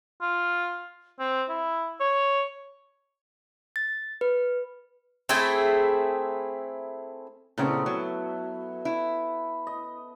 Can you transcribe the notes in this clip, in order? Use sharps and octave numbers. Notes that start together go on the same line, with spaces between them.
F4
C4
E4
C#5
A6
B4
A3 C4 E4 G#4
A#2 C#3 A3 B3 C4 E4
F#3 B4
E4
D#5